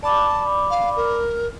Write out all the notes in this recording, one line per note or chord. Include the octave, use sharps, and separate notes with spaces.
D5 A5 B5 D6
F5
A#4